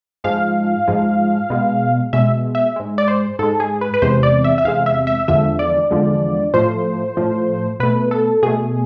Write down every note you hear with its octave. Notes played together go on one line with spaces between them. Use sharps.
G#2 F3 G#3 F5
G#2 F3 G#3
B2 G#3
B2 G#3 E5
E5
G#2 G#3
D5
C5
G#2 G#3 A4
G#4
B4
B4
E2 C3 G#3 C5
D5
E5
E5
E2 C3 G#3 F5
E5
E5
E2 D3 F3 G#3 E5
D5
E2 D3 F3 G#3
A2 F3 A3 C5
A2 F3 A3
B2 A3 B4
A4
B2 A3 G#4